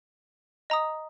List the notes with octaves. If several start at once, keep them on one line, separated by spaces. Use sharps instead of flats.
D#5 A#5 D#6